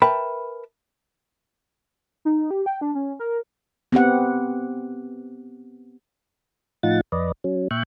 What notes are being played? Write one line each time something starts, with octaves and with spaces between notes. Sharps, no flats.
A#4 B4 E5 G5 A5 B5
D#4
G4
G5
D4
C#4
A#4
B3 C4 G4 F#5
A2 F3 D#4 F4 F#5 A6
F2 B4 D5 D#5
F#3 C#4
A#2 E5 G5 C#6 F#6